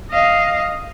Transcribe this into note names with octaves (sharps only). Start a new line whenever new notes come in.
D#5 F5